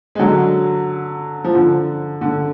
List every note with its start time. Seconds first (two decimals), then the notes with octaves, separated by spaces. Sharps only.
0.15 G#3
0.19 D3 F#3
1.44 F3
1.55 D3
2.21 D3